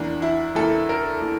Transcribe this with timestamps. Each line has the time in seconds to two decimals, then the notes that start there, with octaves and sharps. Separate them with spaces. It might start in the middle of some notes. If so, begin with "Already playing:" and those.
Already playing: E2 E3 A#3 D4
0.22 E4
0.55 E2 E3 A#3 A4
0.89 A#4
1.22 E3 A#3